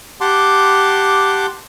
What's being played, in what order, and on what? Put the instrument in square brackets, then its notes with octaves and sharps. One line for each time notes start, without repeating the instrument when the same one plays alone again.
[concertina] G4 F#5 A5 C6 D6